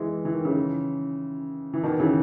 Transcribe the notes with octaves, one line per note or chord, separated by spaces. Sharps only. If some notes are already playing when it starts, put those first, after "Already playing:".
Already playing: E3 G#3
E3
D#3
C#3 E3
E3
B2 D#3
C#3 E3